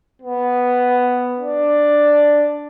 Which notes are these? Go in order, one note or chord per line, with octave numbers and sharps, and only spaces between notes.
B3
D4